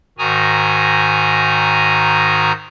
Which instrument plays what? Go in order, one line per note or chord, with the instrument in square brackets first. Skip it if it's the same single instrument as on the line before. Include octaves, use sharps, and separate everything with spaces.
[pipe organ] G#2 D#3 F#4 G#5 A#5 D#6